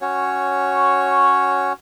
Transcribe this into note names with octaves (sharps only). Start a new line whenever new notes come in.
C#4 F#4 C#5